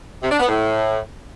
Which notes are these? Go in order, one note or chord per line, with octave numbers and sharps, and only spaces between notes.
C3
D4
B3
A2